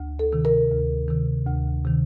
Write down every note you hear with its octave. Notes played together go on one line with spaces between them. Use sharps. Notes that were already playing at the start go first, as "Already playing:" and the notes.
Already playing: D2
A4
C3 D#3
A#4
D2
C3 D#3
D2
C3 D#3